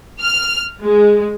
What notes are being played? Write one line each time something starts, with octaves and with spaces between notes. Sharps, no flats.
F6
G#3